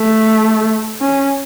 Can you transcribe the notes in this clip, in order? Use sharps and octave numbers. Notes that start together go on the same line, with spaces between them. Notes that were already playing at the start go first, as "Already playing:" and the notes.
Already playing: A3
C#4